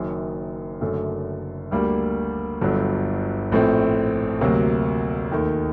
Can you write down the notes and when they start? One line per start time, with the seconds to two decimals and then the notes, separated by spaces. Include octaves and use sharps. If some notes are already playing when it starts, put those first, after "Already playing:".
Already playing: F#1 F#2 D#3
0.81 F#1 F#2 D3 A3
1.71 D2 D3 G3 A#3
2.61 G1 G2 D3 F#3
3.52 A#1 A2 A3 C4
4.41 D2 C3 F#3 A#3
5.32 D#2 D#3 A3